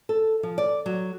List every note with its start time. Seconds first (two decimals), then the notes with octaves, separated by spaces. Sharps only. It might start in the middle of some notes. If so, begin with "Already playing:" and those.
0.09 A4
0.43 F3
0.58 D5
0.86 F#3